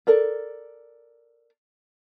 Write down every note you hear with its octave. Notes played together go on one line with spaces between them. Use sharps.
A4 A#4 D5